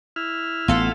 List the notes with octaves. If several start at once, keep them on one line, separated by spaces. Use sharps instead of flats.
E4 F6
A1 B3 F4 A4 F#5